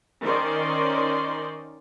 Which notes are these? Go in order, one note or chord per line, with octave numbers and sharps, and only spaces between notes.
D#3 C#4 D#4 C5 D5 C6